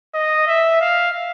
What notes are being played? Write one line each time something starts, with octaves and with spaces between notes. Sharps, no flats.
D#5
E5
F5